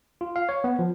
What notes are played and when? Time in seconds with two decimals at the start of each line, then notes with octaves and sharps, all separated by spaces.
0.21 F4
0.36 F5
0.49 C#5
0.64 B3
0.79 F3